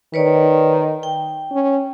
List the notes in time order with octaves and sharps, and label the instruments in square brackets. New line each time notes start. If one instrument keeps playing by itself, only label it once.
[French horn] D#3 [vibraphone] B4 C#5 D5
[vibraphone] G5
[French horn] C#4